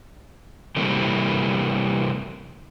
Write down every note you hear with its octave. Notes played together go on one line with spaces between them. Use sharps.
C3 E3 G3 A3 A#3 C4